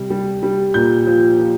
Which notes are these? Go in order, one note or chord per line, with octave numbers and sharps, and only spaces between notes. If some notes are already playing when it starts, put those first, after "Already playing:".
Already playing: C3 G3
G3
G3
A#2 G6
F3
F3